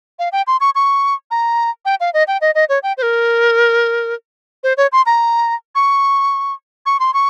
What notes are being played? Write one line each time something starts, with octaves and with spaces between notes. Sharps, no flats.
F5
G5
C6
C#6
C#6
A#5
G5
F5
D#5
G5
D#5
D#5
C#5
G5
C5
A#4
C5
C#5
C6
A#5
C#6
C#6
C6
C#6